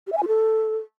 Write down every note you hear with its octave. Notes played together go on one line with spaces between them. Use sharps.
G4
E5
G#5
F4
A4